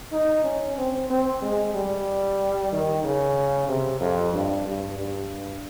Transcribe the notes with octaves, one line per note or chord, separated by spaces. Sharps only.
D#4
C#4
C4
C4
G#3
G3
D#3
C#3
C3
F2
G2
G2
G2